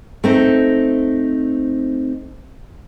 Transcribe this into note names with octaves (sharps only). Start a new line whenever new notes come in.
A3 C4 D#4